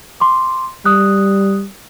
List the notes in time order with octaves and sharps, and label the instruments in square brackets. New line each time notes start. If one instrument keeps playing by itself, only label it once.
[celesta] C6 D6
[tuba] G3 [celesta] D#6 F#6